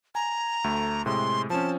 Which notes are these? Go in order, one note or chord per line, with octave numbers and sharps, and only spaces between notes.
G#5 A#5
D2 A3
A2 C3 G#3 C6
F3 C4 C#4 A5